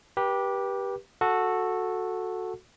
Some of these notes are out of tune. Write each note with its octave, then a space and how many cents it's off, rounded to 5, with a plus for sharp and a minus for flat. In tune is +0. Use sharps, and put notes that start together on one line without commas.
G4 +0 B4 -35
F#4 -15 A4 +0